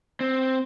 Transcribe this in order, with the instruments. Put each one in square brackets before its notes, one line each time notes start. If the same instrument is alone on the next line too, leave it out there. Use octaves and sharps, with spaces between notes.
[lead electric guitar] C4